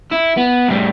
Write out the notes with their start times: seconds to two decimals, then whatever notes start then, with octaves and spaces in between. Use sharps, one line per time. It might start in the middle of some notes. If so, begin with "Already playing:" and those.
0.11 E4
0.37 B3
0.68 A2 G3